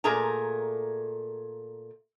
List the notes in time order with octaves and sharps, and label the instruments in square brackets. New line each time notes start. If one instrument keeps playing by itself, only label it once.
[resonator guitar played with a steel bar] A#2 A3 G#4 A#4 A#5